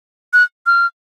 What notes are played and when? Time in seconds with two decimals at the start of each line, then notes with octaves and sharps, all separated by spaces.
0.33 F#6
0.66 F6